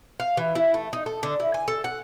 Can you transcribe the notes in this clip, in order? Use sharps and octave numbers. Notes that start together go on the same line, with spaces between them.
F5
E3
E4
A3
D#4
A4
D3
E4
G#5
A4
F#5